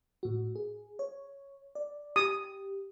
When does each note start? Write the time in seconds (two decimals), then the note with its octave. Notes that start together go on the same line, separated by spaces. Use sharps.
0.23 A2 F#4
0.56 G#4
0.99 C#5
1.75 D5
2.16 G4 D#6